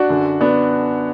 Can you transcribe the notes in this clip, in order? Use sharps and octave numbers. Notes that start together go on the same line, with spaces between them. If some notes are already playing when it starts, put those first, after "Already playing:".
Already playing: D4 F#4
F#2 D3
B3 D4